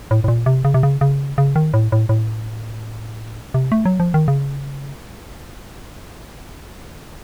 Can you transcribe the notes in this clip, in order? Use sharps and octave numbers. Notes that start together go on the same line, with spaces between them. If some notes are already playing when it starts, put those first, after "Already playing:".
A2
A2
A#2
C3
C#3
C3
C#3
C#3
C#3
D#3
A2
A2
A2
C3
A3
F#3
F3
D#3
C#3